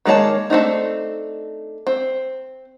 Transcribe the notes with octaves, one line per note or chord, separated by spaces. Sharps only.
D#3 G#3 A#3 C#5 A5
A3 C4 D4 D#4
C4